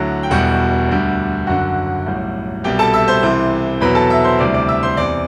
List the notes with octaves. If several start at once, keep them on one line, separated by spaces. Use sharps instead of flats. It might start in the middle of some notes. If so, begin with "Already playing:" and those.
Already playing: D2 D3 F#3 E4
G5
E1 E2 B2 G3 F#4 F#5
D2 D3 G3
F#1 F#2 D3 F#4 F#5
B1 A2 G3
C2 B2 G3 G4 G5
A4 A5
E5 E6
C5 C6
C2 C3 E3
E2 B2 F#3 B4 B5
A4 A5
E5 E6
C5 C6
D2 C3 E3 G3 D5 D6
D5 D6
E5 E6
C5 C6
E2 C3 E3 D5 D6